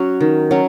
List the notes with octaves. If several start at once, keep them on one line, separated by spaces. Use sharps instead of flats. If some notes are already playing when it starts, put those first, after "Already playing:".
Already playing: F#3 C#4 F#4
D#3
F#3 C#4